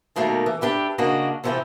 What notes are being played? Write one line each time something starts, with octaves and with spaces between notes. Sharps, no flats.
B2 D#3 G3 A3 A#3
E3
D4 G4 B4 E5
C#3 A#3 D4 F#4 D#5
C3 E3 F3 E4 G4 A4